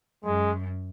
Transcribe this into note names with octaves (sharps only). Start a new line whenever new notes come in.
F#2 G#3